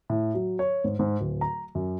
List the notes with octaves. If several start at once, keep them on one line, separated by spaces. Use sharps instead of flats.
A2
F#3
C#5
G#2
G#2
D1
A#5
F#2